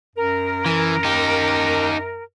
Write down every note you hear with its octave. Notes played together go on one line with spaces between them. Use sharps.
F#2 A#4
E3
D#4 G4